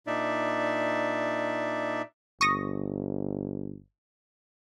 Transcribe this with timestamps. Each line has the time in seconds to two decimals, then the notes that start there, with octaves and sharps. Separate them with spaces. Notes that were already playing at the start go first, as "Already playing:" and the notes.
0.07 A#2 D4 D#4 D5 E5
2.41 G1 C#6 D#6 A#6